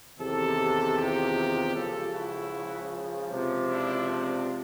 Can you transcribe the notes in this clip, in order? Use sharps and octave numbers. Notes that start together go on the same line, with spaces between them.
E2 C3 D#3 G4 A4
F4 G4
C#2 C#3 F3 G4 A4
E4 F#4
C#2 C3 F3
D4 E4
C4 D4